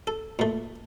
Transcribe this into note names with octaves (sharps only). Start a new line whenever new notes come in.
A4
A#2 A3